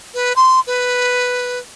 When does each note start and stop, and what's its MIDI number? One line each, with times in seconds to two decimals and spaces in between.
0.14 0.33 71
0.36 0.60 84
0.67 1.59 71